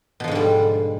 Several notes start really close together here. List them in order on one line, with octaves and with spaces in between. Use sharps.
B2 F3 G#2 D3 G3